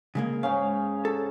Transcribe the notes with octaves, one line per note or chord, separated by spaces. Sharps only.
C#3 G#3 A#3
G#2 C#3 C#4 F5
A4